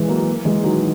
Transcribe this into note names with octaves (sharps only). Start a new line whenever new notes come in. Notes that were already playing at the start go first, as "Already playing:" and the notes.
Already playing: E3 G#3
F#3 A#3
E3 G#3
D#3 F#3